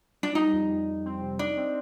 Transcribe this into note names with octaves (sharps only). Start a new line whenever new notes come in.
D4
G3 D#4
F2
F2
F2
C4
C3
D4 D#4
C4